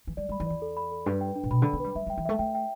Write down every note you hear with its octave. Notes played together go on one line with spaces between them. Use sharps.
E3
G3 D5
G3 B5
E3
E2 D5
A4
B5
A4
G2 B4
G5
D4
A2
B2 B5
D3 B5
B3
G3 B4
G3 E5
G3 G5
E3
A3 E5
A3 G5
G5